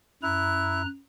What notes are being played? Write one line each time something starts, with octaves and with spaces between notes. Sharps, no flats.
F#2 E4 A#5 F#6